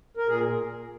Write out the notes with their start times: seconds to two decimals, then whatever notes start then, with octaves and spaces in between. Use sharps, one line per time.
0.17 A#4
0.27 A#2 G#4